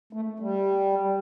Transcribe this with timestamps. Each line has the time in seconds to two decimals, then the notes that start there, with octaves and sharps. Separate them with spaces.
0.13 A3
0.40 G3